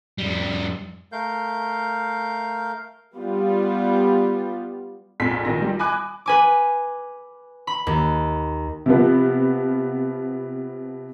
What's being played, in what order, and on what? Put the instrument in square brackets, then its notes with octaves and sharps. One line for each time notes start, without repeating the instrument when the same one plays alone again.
[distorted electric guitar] F2 G3
[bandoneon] A3 A#4 F5 G6
[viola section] G3 B3 F4
[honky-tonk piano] A#1 F2 G#2 B6
A#1 D#3 A#6
G3
G#5 B5 D6 D#6 F#6
[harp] B4 G#5 D6
B5
D#2
[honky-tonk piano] C3 F3 B3